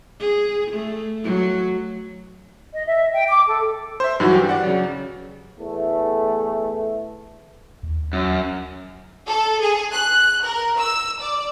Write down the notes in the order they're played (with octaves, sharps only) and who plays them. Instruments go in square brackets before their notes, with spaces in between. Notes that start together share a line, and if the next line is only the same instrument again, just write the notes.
[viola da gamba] G#4
A3
F#3
[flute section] D#5
E5
G5
D6
A4
[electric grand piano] C5 E5
G2 D#3 E3 F#3 E4 F#4
G4
D5 F#5
C#3 F#3
[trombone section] E2 A3
[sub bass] D#2
[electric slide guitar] F#2
[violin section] A4
G#4
F#6
A#4
E6
D5